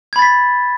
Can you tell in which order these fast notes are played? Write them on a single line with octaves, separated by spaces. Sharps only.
G#6 B5 A6 B6